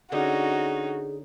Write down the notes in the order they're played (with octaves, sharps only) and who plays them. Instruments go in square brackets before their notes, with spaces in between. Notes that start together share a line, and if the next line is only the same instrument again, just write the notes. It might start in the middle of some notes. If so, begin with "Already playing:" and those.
[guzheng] D3 [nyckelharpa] C#4 D#4 [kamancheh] F#4 [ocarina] G#4